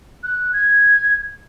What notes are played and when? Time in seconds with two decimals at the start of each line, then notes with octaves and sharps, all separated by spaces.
0.23 F#6
0.53 G#6